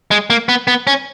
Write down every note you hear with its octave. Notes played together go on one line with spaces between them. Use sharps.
G#3
A#3
B3
B3
C#4